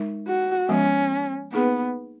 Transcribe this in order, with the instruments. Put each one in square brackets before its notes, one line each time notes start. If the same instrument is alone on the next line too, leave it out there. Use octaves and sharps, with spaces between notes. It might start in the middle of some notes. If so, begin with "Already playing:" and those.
Already playing: [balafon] G#3 D#4 A#4
[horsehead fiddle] F#4
[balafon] F3 G#3 B3 [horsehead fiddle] C#4
[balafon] A#3 D#4 G#4 B4 [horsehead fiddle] B3